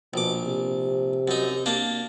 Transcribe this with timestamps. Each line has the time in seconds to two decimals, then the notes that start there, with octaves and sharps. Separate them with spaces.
0.14 A#1 B2 D6
0.44 C3
1.28 F#2 D#4
1.66 A#3 D4